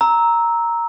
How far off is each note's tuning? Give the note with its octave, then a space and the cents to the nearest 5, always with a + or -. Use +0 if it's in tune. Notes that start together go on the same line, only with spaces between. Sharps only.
A#5 +0 E6 -15